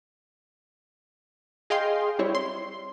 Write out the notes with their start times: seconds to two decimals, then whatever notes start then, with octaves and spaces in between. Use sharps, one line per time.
1.70 G#4 D#5 F5 G5 C6
2.19 G3 C4 E4 C#5
2.35 C6